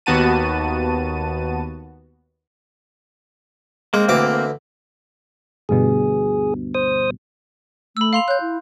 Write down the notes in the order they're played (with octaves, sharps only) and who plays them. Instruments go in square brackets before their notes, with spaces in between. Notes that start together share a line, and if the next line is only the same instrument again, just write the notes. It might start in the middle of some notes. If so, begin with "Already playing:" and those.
[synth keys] D#2 B3 F#4 A5 D#7
[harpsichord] G#3 [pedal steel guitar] A#3 C4
[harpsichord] D2 E3 D6
[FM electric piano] D2 G2 B2 [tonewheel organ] G#4
[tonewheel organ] C5 D#6
[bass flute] A3 [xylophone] B5 E6
[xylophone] F5 C6 F7
[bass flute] C#5 [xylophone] F#6 G6
[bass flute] E4